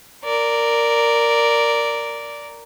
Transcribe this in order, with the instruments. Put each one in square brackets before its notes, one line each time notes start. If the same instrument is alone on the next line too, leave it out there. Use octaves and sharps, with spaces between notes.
[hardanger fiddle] A#4 D5